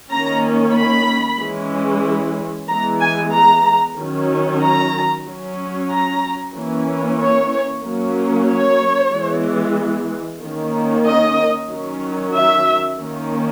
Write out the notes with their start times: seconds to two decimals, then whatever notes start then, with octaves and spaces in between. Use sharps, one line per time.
0.11 D#3 A#3 C#4 A#5
0.75 B5
1.40 E3 G#3 C#4
2.68 E3 G#3 B3 A#5
3.01 G#5
3.33 A#5
3.97 D#3 F#3 C#4
4.61 A#5
5.27 F#3 C#4
5.91 A#5
6.55 E3 A#3 C#4
7.20 C#5
7.84 F#3 A#3 C#4
8.49 C#5
9.12 E3 G#3 B3
10.41 D#3 A#3 C#4
11.06 D#5
11.70 D#3 F#3 C#4
12.35 E5
13.00 D#3 A#3 C#4